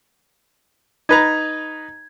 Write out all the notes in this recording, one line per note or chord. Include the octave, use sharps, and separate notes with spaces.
D#4 B4 A#5 G#6